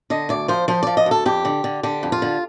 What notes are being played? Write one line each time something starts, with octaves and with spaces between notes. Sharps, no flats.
D3 D#5
D2 D5
F3 C5
F3 C5
F3 D5
D#5
D2 A4
F2 G4
D3
D3
D3 G4
F2
F4
D3